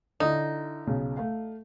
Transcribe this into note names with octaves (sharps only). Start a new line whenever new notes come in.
D3 D#4 E4
B1 C#3
A3 F5